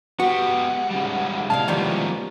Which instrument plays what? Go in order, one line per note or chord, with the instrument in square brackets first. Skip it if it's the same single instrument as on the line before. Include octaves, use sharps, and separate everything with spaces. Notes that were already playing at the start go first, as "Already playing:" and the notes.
[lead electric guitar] C#2 F#5 [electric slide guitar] B3 G4 [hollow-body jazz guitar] F#4
[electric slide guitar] C#3 G3
[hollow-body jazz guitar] C2 C#3 A5 [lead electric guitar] G#3 E4 [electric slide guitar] F5
[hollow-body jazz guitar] D#3 F3 G3 [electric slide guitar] A#3 B3 C#4